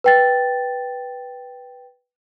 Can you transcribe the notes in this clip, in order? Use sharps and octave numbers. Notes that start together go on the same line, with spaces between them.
B4 G5 A6